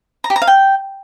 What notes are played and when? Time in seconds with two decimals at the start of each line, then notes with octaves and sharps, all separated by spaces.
0.24 A#5
0.30 G4
0.36 A#5
0.42 F5
0.47 G5